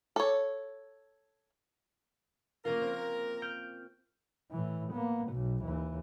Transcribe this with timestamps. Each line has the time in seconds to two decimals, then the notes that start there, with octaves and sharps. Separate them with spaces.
0.16 A4 C#5
2.65 A#3 C#4 F4 A#4
2.81 C4
3.42 F6 G6 D7
4.51 A2 E3
4.92 A#3 B3
5.28 B1 B2
5.62 D#2 E3